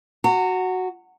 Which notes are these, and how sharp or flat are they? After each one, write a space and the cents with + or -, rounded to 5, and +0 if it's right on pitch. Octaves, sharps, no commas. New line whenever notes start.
F#4 +0 A#5 -35